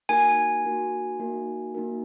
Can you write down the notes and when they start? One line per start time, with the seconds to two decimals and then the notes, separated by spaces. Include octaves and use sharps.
0.09 A#3 D#4 F#4 A#4 G#5
0.65 A#3 D#4 F#4 A#4
1.19 A#3 D#4 F#4 A#4
1.75 A#3 D#4 F#4 A#4